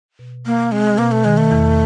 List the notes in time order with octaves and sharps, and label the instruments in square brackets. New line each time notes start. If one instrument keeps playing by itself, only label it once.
[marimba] B2
[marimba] B2 [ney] A#3
[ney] G#3 [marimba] C4
[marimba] B2 [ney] A#3
[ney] A3
[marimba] D#3 [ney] G#3
[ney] A3
[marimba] E2